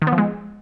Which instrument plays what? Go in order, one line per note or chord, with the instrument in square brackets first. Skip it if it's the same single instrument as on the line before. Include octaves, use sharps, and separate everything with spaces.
[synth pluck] D#3
B3
F3
G#3